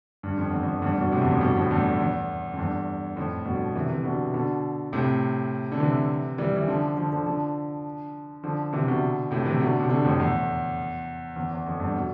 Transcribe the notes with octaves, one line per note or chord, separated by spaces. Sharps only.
G2
F2
E2
F2
E2 G2
G2 B2
A2 C3
E2 G2
F2
G2 B2
F2 A2
E2 G2
E2
F2
E2 G2
F2 A2
G2 B2
C3 E3
C3 E3
B2 D3
B2 D3
A2 C3
D3
C3 E3
E3 G3
E3
D3 F3
D3 F3
D3 F3
D3 F3
D3 F3
C3 E3
B2 D3
A2 C3
C3 E3
B2 D3
C3
B2 D3
F2 A2
E2
E2
E2
F2
E2 G2
B2